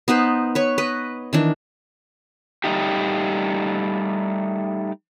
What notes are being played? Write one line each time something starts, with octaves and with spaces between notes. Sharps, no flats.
B3 D#4 B4 C5
B4 C#5
B4 D#5
D#3 E3 D4
G3 A3 D#4 G4